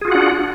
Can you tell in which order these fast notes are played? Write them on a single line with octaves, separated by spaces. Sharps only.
G#4 F4 F#4 F#5 D4